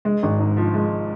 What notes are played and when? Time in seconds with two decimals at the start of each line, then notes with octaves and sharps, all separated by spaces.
0.05 G#3
0.23 G#1
0.40 G#2
0.57 F3
0.74 G#3